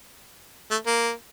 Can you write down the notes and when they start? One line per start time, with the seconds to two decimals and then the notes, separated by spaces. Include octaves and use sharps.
0.71 A3
0.87 A#3